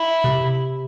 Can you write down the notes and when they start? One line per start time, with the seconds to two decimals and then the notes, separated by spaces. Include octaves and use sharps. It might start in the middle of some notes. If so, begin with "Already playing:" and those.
Already playing: E4
0.24 C3